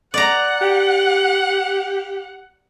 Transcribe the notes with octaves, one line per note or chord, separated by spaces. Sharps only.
D5 F#5 A#5
G4